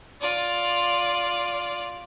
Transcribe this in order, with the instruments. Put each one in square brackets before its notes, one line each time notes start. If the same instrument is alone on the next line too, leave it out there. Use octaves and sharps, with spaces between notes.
[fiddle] F4 D5